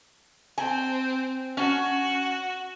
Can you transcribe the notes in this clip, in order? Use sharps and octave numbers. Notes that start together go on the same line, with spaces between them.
C4 G#5
C#4 F#4